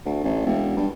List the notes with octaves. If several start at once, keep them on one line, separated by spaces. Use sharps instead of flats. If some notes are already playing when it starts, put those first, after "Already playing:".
D2
A1
E1
G2